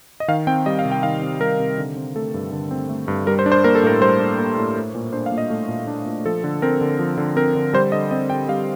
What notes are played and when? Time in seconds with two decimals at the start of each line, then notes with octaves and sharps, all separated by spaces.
0.20 D#5
0.28 D#3 F5
0.47 C4 G5
0.66 G3 D#5
0.79 F5
0.85 C3
0.92 G5
1.03 D#3 F5
1.22 C4
1.40 G3 A#4
1.59 C3
1.78 D3
1.96 C4
2.16 A3 A4
2.34 G2
2.52 D3
2.71 C4
2.89 A3
3.08 G2
3.27 G3 A#4
3.39 C5
3.46 D4
3.52 C5
3.64 A#3 A#4
3.75 A4
3.83 A2 A#4
4.01 G3 C5
4.20 D4
4.38 A#3
4.58 A2
4.76 A3
4.95 A#2
5.13 D4 C5
5.26 F5
5.32 A#2
5.38 D#5
5.50 A3
5.69 A#2
5.87 D4
6.06 A#2
6.26 F3 A4
6.44 D3
6.62 C4 A#4
6.81 D3
6.99 F3
7.17 D3
7.36 C4 A#4
7.55 D3
7.73 G3 C5
7.92 D3 D#5
8.11 C4 D#5
8.30 D3 G5
8.49 G3 F5